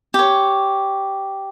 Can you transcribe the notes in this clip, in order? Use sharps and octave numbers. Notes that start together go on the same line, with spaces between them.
G4 C#5